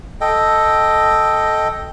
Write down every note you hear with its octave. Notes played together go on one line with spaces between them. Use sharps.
A4 D#5 G5